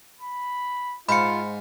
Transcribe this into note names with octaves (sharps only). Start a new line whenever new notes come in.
B5
G#2 F4 C5 F5 B5 C#7